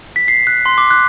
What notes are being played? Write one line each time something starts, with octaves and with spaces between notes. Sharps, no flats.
B6
C7
F#6
C6
D6
F#6